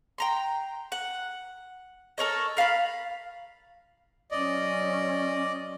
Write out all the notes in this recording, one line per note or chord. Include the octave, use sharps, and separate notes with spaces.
G5 A#5 C6
F#5
A4 A#4 C#5 D#5
A#4 F5 A5 B5
F#3 C#4 D5 D#5